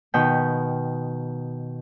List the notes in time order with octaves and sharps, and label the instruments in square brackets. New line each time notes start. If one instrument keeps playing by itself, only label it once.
[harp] B2 D#3 B4 G5